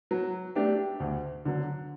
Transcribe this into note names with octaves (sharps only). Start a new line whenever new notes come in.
F#3
A3 D4 G4
D2
D3 F#3